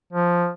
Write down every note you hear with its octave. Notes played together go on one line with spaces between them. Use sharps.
F3